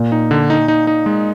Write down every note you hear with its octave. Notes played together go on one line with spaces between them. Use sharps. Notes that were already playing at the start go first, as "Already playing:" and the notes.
Already playing: A#2
D#4
D3
D#4
D#4
D#4
G#3